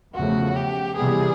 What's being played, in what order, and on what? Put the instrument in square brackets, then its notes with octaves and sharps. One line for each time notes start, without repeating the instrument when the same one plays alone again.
[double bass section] E2 C#3 F3 A3 [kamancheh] F#4
[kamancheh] G4
[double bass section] C3 E3 G3 B3 [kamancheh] G#4